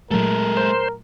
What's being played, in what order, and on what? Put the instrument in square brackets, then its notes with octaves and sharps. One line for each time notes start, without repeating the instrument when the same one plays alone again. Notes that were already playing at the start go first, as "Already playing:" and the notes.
[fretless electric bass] A#2 F#3 A3 [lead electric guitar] G#3 A4 [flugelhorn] A#4
[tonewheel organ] C5